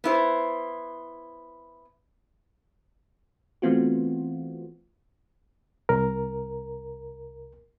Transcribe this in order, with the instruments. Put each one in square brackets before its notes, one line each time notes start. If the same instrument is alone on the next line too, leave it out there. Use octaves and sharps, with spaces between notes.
[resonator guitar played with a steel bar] B3 E4 C5
[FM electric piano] E3 A3 B3 C4 F4 F#4
[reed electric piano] C2 A#4